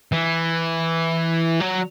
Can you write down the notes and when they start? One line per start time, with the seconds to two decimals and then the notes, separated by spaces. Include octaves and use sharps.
0.12 E3
1.61 F#3